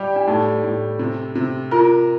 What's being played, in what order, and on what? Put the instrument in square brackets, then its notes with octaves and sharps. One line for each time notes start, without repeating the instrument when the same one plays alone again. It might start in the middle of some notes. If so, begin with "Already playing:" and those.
Already playing: [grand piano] G3 G4
[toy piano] D4
[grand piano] A2 [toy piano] D#4
[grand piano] A2
C3
C3
[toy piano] F4 [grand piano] A#4